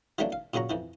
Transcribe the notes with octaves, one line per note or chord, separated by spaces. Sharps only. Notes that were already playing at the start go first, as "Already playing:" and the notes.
E3 F#3 G3 A3 A#3 D4
F5
A#2 C#3 F#3 F#4 A#5
F2 E3 F3